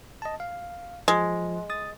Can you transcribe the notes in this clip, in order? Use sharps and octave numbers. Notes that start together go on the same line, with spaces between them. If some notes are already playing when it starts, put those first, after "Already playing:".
D#5 A5
F5
F3 G#3
D#6 A6